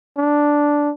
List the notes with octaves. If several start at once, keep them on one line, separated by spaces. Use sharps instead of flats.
D4